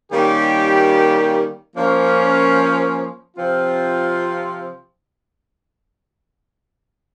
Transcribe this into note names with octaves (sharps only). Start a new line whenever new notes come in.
D#3 G3 A#3 C#4 G4
F3 A#3 C#4
C3 F3 C4 F4